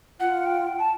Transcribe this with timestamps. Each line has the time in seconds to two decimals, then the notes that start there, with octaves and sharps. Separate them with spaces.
0.20 F4 F#5
0.45 G5
0.79 A5